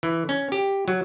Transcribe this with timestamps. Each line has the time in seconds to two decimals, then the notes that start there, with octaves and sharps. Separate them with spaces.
0.03 E3
0.29 C#4
0.52 G4
0.88 F#3